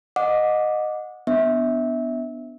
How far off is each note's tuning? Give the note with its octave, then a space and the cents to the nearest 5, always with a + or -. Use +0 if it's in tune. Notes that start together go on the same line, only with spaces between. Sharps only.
D#5 -10 F#5 -25 D6 +0
B3 +0 D4 +0 E5 -20